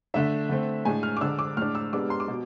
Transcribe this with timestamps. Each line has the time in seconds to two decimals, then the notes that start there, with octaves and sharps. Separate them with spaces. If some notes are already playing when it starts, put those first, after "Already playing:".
0.14 D3 A3 D4 E5
0.49 D3 A3 C4
0.85 A2 G#3 D4 G#5
1.03 F6
1.17 D6
1.21 D3 G#3 D4 E6
1.39 D6
1.57 A2 G#3 D4 F6
1.75 E6
1.92 C3 G#3 B3 D4 D6
2.10 C6
2.20 D6
2.28 B2